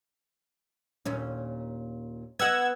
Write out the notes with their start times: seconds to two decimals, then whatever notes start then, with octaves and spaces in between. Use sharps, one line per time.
1.06 D#2 A#2 C#4
2.39 B3 D#5 F#5 E6 G#6